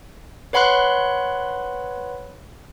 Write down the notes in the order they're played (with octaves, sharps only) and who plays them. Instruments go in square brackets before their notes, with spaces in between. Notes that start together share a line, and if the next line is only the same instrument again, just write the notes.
[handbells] B4 C#5 F#5 B5 C6 F#6